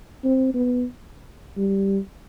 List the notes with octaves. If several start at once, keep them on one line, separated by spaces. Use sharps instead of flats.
C4
B3
G3